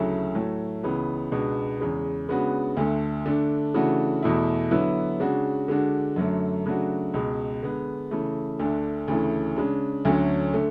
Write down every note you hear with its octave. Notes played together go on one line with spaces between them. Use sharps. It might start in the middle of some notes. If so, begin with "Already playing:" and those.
Already playing: D2 C#3 F#3 A3 E4
A2 F#3 A3
C#2 C#3 E3 B3
C#2 B2 G#3 B3 D4
E2 C#3 G#3
C#3 G#3 B3 D4 F#4
D2 D3 A3
D3 A3 D4
C#3 E3 A3 D4 F#4
E2 B2 A3 E4
D3 F#3 B3 E4
C#3 G#3 D4 F#4
D3 G#3 D4 F#4
F#2 D3 F#3 A3
C#3 F#3 A3 D4 F#4
C#2 B2 G#3
D3 G#3 B3
C#3 E3 A3
D2 D3 A3 D4
D2 C#3 E3 A3
C#3 G#3 D4
D2 D3 F#3 A3 C#4
D3 A3